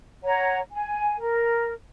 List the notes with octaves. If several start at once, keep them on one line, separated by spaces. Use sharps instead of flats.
C#5 F#5 A#5
G#5
A#4